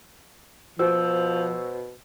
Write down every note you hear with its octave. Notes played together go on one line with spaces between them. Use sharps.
B2 F3 F#4 C5 E6